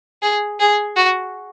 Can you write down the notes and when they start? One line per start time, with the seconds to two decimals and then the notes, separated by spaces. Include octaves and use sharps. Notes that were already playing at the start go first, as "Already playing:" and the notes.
0.22 G#4
0.60 G#4
0.96 F#4